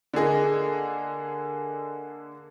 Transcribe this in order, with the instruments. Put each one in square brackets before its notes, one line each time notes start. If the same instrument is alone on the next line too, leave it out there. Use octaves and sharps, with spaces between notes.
[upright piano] D3 A#3 G#4 D#5